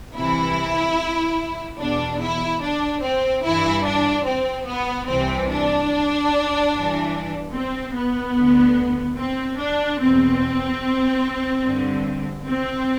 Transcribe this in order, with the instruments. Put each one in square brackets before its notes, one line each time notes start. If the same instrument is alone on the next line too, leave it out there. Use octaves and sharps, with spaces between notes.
[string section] C2 C3 E3 E4
E2 B2 D4
E4
D4
C4
G2 E3 E4
D4
C4
B3
C2 C3 E3 C4
D4
G2 E3
C4
B3
D2 D3
C4
D4
E2 B2 C4
G2 D3
C4